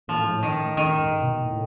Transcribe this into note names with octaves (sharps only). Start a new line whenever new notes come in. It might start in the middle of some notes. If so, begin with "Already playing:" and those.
A#2 F3
A2
G#2
A2
D#3
A2 D#3
G#2
B2
A2